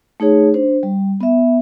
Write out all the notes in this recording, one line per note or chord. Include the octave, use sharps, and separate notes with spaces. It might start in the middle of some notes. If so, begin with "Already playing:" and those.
A3 D#4 G#4 C#5
D4 C5
G3
B3 E5